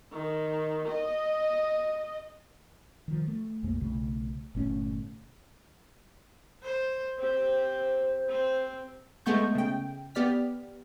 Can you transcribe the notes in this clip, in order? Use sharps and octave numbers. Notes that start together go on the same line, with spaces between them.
D#3
D#5
D#3 F3
A3
B1 F2 A3 A#3
B1 C#3 A3
G1 A#2 A3 C#4
C5
C4 G4 C5
C4
G#3 A3 B3 C#6 G6
C#3 G5
B3 G4 D5 F6 B6